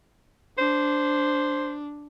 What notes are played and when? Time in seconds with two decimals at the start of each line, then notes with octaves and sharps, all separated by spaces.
0.58 D4 C5